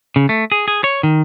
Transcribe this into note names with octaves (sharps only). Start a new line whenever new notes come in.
C#3
A3
G#4
G#4
C#5
D#3